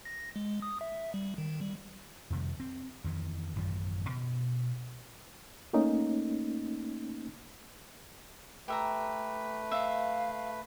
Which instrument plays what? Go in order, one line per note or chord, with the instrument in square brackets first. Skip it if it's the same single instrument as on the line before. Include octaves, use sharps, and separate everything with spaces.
[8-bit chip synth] A#6
G#3
D#6
E5
G3
D#3
G3
[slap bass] F2 C3 D#3 G3
C4
F2 D#3 E3
A1 F#2 D#3 F3
B2
[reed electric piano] A3 A#3 C#4 D#4
[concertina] A3 B4 [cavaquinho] G4 E5 A#5
[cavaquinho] E5 [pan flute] F5